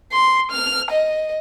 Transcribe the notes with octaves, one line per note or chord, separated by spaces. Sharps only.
C6
F6
D#5